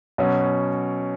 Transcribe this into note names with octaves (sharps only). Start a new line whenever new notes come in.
B2 F#3 C#4